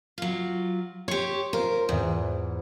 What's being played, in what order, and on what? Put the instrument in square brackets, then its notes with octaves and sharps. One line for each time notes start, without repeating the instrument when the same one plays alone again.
[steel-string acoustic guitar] F#3 F4
[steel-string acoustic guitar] G4 C#5 [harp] C6
[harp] F4 C5 [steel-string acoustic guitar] A#4
[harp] E2 E3 [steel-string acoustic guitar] G#2